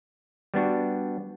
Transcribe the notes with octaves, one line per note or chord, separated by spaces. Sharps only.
G3 B3 D4 F#4